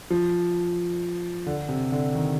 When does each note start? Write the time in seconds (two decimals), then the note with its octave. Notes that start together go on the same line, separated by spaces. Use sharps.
0.10 F3
1.47 D3
1.69 C3
1.92 D3
2.15 D#3